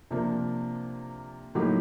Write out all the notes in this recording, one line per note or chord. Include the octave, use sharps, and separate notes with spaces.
C3 F3 A#3 D4
A2 F#3 A#3 D#4 G4